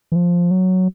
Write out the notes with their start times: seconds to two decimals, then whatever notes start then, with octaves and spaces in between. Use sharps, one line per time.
0.12 E3
0.16 F3
0.51 F#3